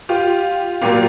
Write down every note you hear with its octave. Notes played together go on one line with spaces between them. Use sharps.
F4 G4
A#2 F#3 A#3 F4 G4